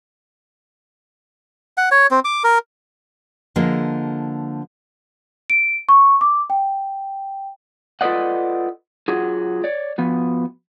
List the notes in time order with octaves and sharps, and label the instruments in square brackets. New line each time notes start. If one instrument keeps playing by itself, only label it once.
[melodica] F#5
C#5
C4
D6
A#4
[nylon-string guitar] D3 F3 G#3 A#3
[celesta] D7
C#6
D6
G5
[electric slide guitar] F4 A4 B4 D5 D#5 F#5
F#3 F4 F#4 G#4
C#5 D5
F3 B3 F#4